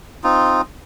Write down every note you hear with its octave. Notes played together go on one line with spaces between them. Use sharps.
C4 D#4 F4